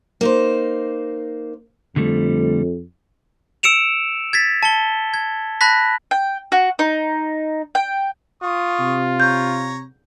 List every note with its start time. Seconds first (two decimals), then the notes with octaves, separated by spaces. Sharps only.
0.21 A#3 D#4 C5
1.96 F2 D3 G3 A3
3.63 E6 C#7 D7 E7 F7
4.33 G#6 A6 B6
4.63 A5 C#7 G7
5.14 G#6
5.61 A5 B5 F#6 A#6 B6
6.11 G5
6.52 F#4
6.79 D#4
7.75 G5
8.43 F4 C#6 D#6
8.80 C3
9.20 C#5 A#5 G6